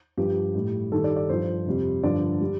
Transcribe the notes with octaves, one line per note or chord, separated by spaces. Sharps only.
G2 F3 G4
A2 G3
G2 D#3 G3 A4
D5
D5
G2 F3 C5
F2 C3 G3
G2 D3 F3 D5
G3